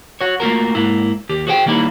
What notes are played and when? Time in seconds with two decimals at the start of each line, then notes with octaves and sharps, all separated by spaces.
0.21 F#4 C#5
0.40 A3 A#3 F4 F#4 A#4
0.75 G#2 A#3 E4
1.29 D#2 G4
1.47 F#4 G#4 C5 F#5 G5
1.66 D#3 G3 A#3 D#4 E4